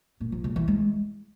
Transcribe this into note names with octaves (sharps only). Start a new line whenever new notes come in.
A#2
F3
C#3
E3
G#3